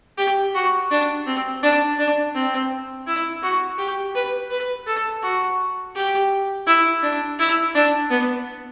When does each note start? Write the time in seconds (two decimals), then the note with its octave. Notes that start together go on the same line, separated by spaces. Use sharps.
0.18 G4
0.54 F#4
0.91 D4
1.27 C4
1.63 D4
1.98 D4
2.34 C4
3.07 E4
3.43 F#4
3.78 G4
4.15 B4
4.50 B4
4.87 A4
5.23 F#4
5.95 G4
6.67 E4
7.03 D4
7.39 E4
7.75 D4
8.10 B3